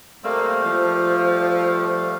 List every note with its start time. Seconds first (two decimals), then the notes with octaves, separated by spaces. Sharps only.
0.24 G3 A3 A#3 C4 C5 F5
0.65 F3